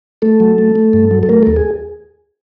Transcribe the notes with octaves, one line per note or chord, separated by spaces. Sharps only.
A3 A4
F#3
A3
A3
G2
F#3
A4
A3 A#4
D#2 A4
G#4